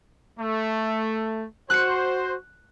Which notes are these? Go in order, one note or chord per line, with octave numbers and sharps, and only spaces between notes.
A3
F#4 C5 F#6 C#7